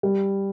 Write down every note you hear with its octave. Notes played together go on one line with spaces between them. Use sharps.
G3